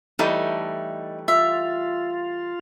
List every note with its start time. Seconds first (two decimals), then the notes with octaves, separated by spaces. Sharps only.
0.19 E3 G3 A3 D#4
1.28 F4 E5